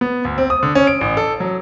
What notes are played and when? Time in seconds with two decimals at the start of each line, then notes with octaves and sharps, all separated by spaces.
0.01 B3
0.25 D2
0.38 C4
0.50 D#6
0.63 D3
0.75 C#4
0.87 D7
1.01 A1
1.17 A4
1.40 F#3